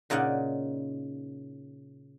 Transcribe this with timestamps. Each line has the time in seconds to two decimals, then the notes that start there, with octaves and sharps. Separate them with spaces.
0.10 A#2 C#3 D#4 D5 F#5